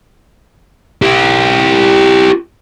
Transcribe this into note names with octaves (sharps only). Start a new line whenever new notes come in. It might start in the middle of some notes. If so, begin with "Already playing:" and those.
E4 G4